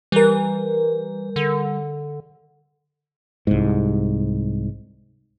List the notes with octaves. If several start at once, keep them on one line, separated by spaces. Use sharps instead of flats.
E3 G3 A#4
D3
C2 G#2